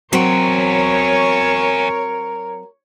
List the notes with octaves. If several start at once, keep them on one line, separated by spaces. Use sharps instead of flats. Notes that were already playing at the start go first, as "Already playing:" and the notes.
E2 F#3 C4 F#4 A#4 C#5 G5